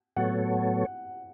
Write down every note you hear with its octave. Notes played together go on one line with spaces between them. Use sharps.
A2 F#3 B3 A4 C#5 F#5